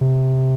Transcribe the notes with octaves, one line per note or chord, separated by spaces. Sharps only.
C3